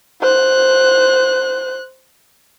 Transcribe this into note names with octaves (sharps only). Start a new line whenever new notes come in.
C5 F#6